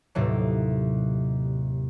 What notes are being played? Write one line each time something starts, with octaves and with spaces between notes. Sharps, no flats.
D#2 A2 C3 F#3